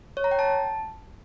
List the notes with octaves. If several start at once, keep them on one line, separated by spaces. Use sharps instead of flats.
C#5
A#5
G5
A5